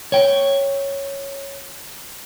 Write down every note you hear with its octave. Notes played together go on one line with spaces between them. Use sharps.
C#5 G5